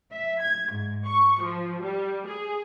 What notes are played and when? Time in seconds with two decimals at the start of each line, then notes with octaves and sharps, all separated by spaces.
0.12 E5
0.42 G#6
0.72 G#2
1.05 C#6
1.42 F3
1.83 G3
2.28 G#4